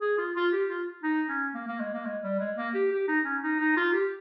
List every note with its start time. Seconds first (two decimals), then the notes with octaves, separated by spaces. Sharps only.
0.01 G#4
0.18 F4
0.35 F4
0.52 G4
0.69 F4
1.03 D#4
1.29 C#4
1.54 A#3
1.68 A#3
1.80 G#3
1.93 A#3
2.06 G#3
2.23 G3
2.39 G#3
2.57 A#3
2.74 G4
2.91 G4
3.08 D#4
3.25 C#4
3.43 D#4
3.60 D#4
3.77 F4
3.93 G4